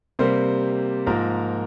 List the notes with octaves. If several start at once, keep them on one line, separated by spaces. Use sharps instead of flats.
C3 G3 A#3 C5
G#2 F3 A#3 A#4